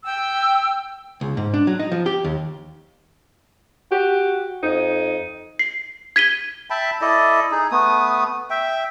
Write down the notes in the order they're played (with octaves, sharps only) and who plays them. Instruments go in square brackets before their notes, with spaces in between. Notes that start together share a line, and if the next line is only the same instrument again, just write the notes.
[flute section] G5 E6
[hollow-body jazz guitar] C#2
G#2
D4
F#3
D#4
F3
G4
D#2
[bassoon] F#4 [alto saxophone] G4
[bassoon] F2 [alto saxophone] D#4
[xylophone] C7
G#6 B6 D#7 G7
[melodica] E5 G5 A5 B5
E4 A4 D5 D#5
D#4 G#4
A3 B3 D#6
E5 G5